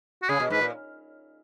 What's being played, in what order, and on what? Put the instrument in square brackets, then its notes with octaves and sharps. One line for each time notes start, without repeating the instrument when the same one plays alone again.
[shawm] F#4
[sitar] C#3 [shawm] G#4
[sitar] B2
[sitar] G#2 [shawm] B4
[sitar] A#2